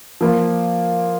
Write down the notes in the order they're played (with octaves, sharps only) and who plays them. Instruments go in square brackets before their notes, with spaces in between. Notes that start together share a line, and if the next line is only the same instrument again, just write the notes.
[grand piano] F3 A#3 F4